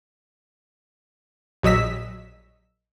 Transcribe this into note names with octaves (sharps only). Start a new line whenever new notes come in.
A#1 F#3 D#5 E6 B6